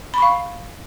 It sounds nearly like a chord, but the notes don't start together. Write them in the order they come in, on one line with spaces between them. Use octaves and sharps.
B5 C#6 F5